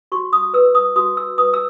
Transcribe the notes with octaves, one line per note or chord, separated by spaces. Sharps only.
F#4 C#6
D#6
B4 E6
D#6
F#4 D#6
E6
B4 D#6
E6